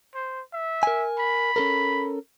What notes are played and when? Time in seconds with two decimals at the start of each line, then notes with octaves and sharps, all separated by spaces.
0.15 C5
0.53 E5
0.83 A#4 G#5
1.19 B5
1.56 C#4 A4 A#4